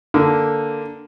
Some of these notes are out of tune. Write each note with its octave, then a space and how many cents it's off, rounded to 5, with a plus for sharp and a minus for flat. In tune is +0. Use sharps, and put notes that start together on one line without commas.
D3 +0 A#3 +0